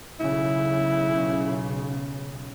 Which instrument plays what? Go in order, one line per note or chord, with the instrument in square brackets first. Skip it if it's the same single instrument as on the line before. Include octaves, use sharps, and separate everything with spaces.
[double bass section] B1 C#3 [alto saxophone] E4